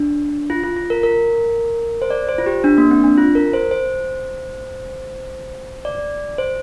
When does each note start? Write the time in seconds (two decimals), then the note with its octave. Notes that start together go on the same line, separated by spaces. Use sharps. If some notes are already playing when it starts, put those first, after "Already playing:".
Already playing: D4
0.50 F4
0.64 F4
0.77 F4
0.90 A#4
1.03 A#4
2.02 C5
2.10 D5
2.29 C5
2.38 F4
2.46 G4
2.64 D4
2.78 A#3
2.91 C4
3.04 D4
3.18 F4
3.35 A#4
3.53 C5
3.71 C5
5.85 D5
6.38 C5